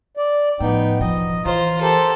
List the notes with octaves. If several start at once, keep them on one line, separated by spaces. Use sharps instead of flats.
D5
A2 F3 B3 D#4 G5
E1 F3 D#5
E3 F4 C5 A#5
G4 A4 A#4 C5